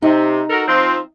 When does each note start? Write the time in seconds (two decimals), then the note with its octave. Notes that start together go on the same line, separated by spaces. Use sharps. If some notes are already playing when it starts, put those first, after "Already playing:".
0.02 C3 D#4
0.50 F#4 A4 A#4
0.68 F3 C4